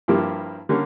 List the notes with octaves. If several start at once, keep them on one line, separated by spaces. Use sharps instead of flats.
G2 F3 A#3 E4 G4
D3 G3 A#3 C#4